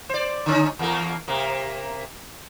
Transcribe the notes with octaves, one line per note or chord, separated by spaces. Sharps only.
C5 D5
D3 C#4 D#4
E2 A#3 A#4
C3 A#3